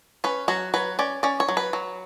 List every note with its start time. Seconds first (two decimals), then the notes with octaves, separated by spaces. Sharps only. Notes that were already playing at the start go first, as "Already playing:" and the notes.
0.24 C#4 B4
0.48 F#3 F#4
0.74 F#3 B4
0.99 C#4 D5
1.23 C#4 D5
1.40 C#5
1.48 F#3
1.57 B4
1.73 F#3